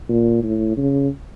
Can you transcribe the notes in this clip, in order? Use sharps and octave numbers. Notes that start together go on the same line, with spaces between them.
A#2
A2
C#3